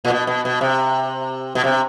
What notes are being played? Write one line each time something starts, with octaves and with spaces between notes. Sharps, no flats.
A#2
B2
B2
B2
C3
B2
C3